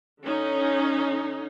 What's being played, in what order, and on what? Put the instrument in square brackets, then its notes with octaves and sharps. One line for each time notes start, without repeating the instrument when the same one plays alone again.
[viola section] D3 C#4 D#4